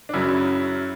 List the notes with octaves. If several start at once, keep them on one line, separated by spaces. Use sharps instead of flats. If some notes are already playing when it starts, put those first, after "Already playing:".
D4
F#2 C#3 F#3 E4